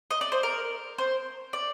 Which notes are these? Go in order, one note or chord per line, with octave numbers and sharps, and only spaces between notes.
D#5
D5
C5
A#4
C5
D5